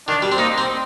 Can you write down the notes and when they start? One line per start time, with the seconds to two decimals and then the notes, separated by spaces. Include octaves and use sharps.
0.08 D#3 D4
0.22 G3
0.32 C4
0.38 A#3 D#4
0.58 C4